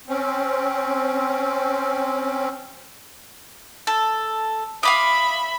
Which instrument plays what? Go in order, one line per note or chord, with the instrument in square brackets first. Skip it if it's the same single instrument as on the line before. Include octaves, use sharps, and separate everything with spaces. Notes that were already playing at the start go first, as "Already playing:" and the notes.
[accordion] C4 C#4
[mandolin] A4
[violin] E5 B5 [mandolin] F5 D6 D#6